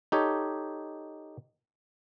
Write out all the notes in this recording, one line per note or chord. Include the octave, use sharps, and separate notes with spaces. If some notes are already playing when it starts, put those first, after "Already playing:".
D#4 G4 A4 C#5